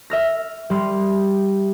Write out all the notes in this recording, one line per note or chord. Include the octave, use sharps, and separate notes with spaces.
E5 F6 A#6
G3 C6 F6